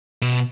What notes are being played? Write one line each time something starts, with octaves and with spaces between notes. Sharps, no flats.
B2